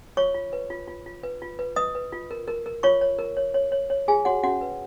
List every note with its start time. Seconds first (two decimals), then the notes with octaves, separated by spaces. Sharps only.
0.17 F4 C#5 C#6
0.34 F4
0.53 B4
0.70 F4
0.88 F4
1.06 F4
1.23 B4
1.42 F4
1.59 B4
1.76 B4 D#5 D#6
1.95 B4
2.12 F4
2.31 A#4
2.48 A#4
2.66 A#4
2.83 F4 C#5 C#6
3.01 C#5
3.19 A#4
3.37 C#5
3.54 C#5
3.72 C#5
3.90 C#5
4.08 F4 G#4 G#5
4.25 F#4 C#5 F#5
4.43 C#4 F#4 F#5
4.61 B4